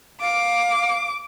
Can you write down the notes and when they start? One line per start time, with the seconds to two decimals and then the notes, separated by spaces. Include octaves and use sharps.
0.21 F5 D6